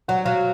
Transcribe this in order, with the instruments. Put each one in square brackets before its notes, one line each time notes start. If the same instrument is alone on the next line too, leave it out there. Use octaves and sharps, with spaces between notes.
[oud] F#3 [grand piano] F#5
[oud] F#3 [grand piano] F5